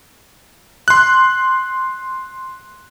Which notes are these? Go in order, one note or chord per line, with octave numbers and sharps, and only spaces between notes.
C6 F#6